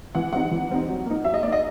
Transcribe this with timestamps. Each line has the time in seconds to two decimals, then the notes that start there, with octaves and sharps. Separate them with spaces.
0.15 E3 F#5
0.33 G3 C4 D#4 F#5
0.51 E3
0.69 G3 C4 D#4
0.88 F#3
1.06 A#3 D#4
1.24 F#3 E5
1.34 D#5
1.43 A#3 D#4 D5
1.52 D#5